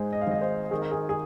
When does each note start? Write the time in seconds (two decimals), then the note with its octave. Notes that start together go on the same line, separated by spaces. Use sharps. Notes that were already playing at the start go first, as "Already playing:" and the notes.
Already playing: G#2 G#3 C5
0.13 D#5
0.21 F5
0.27 G#1 D#5
0.41 C5
0.71 D#3 G#4
0.81 A#4
0.91 G#4
1.09 G#4